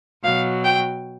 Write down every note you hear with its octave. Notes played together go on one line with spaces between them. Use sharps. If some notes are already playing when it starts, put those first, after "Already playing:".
B2 F#3 F5
G5